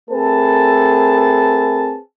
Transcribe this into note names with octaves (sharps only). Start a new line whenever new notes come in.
A3 C4 G#4 A#4 B4 A5